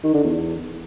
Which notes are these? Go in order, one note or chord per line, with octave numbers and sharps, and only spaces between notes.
D#3
D3
E2